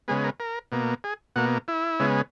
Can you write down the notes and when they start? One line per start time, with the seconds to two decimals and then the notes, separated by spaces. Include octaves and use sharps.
0.08 C#3 G#3 B3 G#4
0.24 A#4
0.40 A#4
0.72 B2 A#3
1.04 G#4
1.36 B2 A#3 F#4
1.68 E4
1.99 C#3 G#3 B3